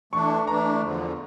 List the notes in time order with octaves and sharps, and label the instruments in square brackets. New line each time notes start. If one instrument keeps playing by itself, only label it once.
[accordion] E3 A3 D4 [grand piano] C#6
[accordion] E3 A3 D4 [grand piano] A#5
[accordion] E2 D3 F3